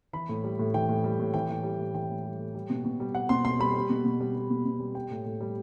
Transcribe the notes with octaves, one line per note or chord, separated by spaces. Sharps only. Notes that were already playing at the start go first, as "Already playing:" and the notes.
E3 B5
A2
G3
A2
E3 G5
A2
G3
A2
E3 G5
A2
G3
A2
E3 G5
A2
G3
A2
G3
B2
B2
G3
G3 F#5
B2 C6
B2 C6
G3 B5
G3
B2
B2
G3
G3
B2
B2
G3
G3 G5
A2
A2
G3